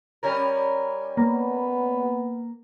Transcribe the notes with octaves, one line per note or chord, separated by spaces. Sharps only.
G3 C#4 A#4
A#3 B3